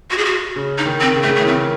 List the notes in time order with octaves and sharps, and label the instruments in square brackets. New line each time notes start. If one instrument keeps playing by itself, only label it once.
[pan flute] F#4
G#4
F#4
[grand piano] C#3
[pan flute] D#4
[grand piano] D#3
[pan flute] C4
[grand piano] C#3
[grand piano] D#3 [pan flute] A3
[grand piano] C#3
[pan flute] A3
[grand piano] E3
[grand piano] D#3 [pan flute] C4